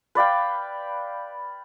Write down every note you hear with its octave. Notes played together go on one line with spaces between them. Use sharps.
B4 D5 F5 G5